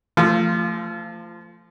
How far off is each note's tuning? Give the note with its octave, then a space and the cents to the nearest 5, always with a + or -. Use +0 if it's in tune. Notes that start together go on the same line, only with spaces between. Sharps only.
F3 -20 A3 +15 F4 +0